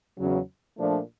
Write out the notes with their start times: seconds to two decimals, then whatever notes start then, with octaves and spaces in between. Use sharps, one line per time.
0.17 E2 C#3 F#3
0.78 A#2 F3 A3 D4